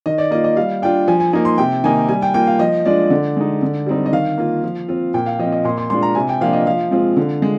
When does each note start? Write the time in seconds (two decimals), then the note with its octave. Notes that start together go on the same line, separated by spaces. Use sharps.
0.06 D#3 D#5
0.18 D5
0.31 A#3 F4 D#5
0.44 D#5
0.56 G3 F5
0.82 D4 F4 G5
1.08 F3 G#5
1.20 G#5
1.33 A#3 D#4 G#5
1.45 C6
1.58 C3 G5
1.84 D#3 A#3 D#4 G#5
2.09 G3 G#5
2.22 G5
2.34 A#3 F4 G5
2.47 F5
2.59 F3 D#5
2.85 G#3 D4 F4 D5
3.10 D3
3.36 G#3 D#4
3.62 D3
3.86 G3 C4 D#4
4.06 D#5
4.13 D#3 F5
4.38 A#3 F4
4.64 F3
4.88 C4 F4
5.14 A#2 G5
5.26 F5
5.39 F3 C4 D#5
5.52 D#5
5.64 A#2 C6
5.78 C6
5.90 G#3 D4 F4 C6
6.03 A#5
6.15 C3 G#5
6.29 G5
6.41 F3 A#3 D4 F4 F5
6.53 D#5
6.67 F3 F5
6.91 G#3 C4 F4
7.17 D3
7.42 G#3